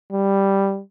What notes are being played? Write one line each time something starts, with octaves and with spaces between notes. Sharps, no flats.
G3